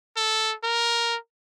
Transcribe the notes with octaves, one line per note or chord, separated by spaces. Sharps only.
A4
A#4